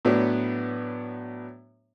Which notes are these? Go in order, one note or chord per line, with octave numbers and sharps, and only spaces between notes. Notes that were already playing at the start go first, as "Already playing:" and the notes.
A2 F#3 B3 D4